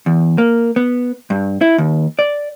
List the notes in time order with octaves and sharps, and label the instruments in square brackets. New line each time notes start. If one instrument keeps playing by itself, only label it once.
[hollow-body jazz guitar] E2
A#3
B3
G2
E4
D#2
D5